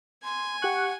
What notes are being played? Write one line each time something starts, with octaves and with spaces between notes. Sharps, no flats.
G#5 C6
G4 F#5 C#6 F#6